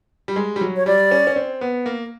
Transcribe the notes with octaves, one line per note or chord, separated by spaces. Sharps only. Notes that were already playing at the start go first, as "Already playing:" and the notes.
G3
G#3
G3
F#3
C#5
G3 D5
C#4
C#4
C4
B3
A#3